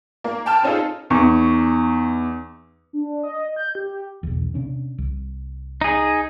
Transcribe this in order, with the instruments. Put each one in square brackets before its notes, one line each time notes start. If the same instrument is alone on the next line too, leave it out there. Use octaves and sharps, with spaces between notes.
[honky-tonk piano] A#3
G5 A5 F6
C4 C#4 D#4 F4 G#4 A4
[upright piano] E2 D#4 C#6
[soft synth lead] D4
D#5
G6
G4
[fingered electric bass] B1 E2
C3 C#4 D4
C2
[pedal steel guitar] D#4 G#4